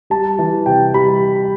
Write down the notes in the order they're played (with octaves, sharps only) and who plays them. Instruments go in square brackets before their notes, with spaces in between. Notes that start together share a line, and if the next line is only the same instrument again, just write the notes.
[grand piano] G3 A5
E3
C3 G5
G3 B5